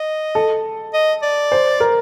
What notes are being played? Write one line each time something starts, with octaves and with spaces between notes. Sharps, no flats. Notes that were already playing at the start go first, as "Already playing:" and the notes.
Already playing: D#5
A4
D#5
D5
C5
A#4